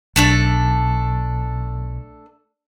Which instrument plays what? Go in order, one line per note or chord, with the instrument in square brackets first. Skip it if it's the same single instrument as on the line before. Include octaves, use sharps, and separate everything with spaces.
[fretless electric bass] B1 [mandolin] A3 D4 A4